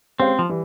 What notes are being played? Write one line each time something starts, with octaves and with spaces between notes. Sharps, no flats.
G#3 C4 C#4 G4 C5 F5
F3
E3 G3